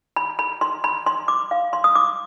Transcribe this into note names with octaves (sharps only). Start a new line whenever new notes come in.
B5
B5
C6
B5
C6
D6
F5
C6
D#6
D6